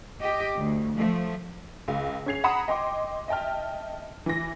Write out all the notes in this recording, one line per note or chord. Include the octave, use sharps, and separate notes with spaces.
G4 D#5
D2
F3 A3
C#2
C#4 G#4 G#6 C7 F7
F#5 A#5 B5 D#6 C#7 E7
D#5 G5 C6 D6
D#5 E5 G5 A5 F6
E3 A#6